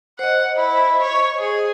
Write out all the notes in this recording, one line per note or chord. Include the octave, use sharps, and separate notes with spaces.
C5 D#5 F#5
E4
C#5
G#4